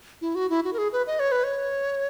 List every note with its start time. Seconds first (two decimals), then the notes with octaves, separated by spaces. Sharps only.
0.21 E4
0.35 F#4
0.50 E4
0.64 F#4
0.73 A#4
0.78 G#4
0.93 B4
1.07 D#5
1.20 C#5
1.32 B4
1.44 C#5